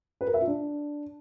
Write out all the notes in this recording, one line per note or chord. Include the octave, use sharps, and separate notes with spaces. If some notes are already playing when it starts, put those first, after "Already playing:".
B4
A#4
E5
F4
D4